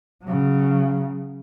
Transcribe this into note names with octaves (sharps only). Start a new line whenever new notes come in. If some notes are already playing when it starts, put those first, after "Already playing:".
C#3 F#3